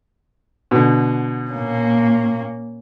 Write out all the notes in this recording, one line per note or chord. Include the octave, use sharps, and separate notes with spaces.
B2 D3
A#2 A#3 C#4